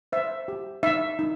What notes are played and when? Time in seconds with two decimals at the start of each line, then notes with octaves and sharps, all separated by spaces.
0.12 C5 E5
0.48 G4
0.83 D#4 E5
1.19 D#4